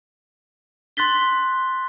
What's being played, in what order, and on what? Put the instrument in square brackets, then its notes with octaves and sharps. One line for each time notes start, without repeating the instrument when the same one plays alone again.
[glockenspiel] C6 F#6 A6 B6 G7